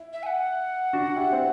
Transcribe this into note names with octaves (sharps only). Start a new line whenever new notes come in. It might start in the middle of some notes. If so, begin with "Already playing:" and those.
Already playing: E4
E5
G#5
F#5
D4 F#4
E4 G4
C4